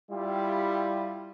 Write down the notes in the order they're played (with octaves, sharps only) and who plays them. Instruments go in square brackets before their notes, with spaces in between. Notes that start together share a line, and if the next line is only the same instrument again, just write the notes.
[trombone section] G3 E4 F4 G4